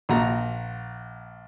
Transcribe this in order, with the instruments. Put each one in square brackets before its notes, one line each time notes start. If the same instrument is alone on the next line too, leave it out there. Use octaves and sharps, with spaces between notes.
[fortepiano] A#1 F#4 A#5